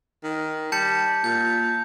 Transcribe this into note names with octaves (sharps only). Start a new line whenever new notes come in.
D#3
G3 A5 G6 C#7
A#2 G6